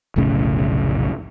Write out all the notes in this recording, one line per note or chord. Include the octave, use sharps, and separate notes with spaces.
F1 B1 A2 C#3